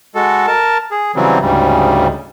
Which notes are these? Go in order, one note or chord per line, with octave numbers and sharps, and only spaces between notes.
G#3 F#4 A4
A#4 A5
G#4
C#3 E3 F#3 G3 C4
D2 G#2 C#3 G3